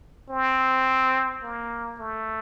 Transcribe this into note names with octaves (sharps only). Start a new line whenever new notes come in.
C4
A#3
A3